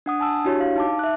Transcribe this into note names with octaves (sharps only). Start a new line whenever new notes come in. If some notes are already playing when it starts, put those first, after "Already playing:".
D4 F#5 D#6
G#5 A5 E6
D4 E4 F#4 G4 C#5
F5
D#4 A5 D6
E5 F#6